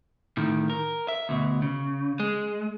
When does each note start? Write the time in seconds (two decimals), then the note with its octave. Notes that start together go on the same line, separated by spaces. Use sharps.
0.37 A2 D#3
0.70 A#4
1.08 E5
1.29 D2 B2
1.62 C#3
2.20 G#3